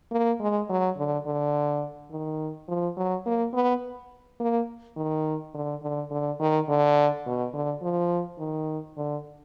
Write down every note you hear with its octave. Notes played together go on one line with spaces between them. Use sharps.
A#3
G#3
F#3
D3
D3
D#3
F3
F#3
A#3
B3
A#3
D#3
D3
D3
D3
D#3
D3
B2
D3
F3
D#3
D3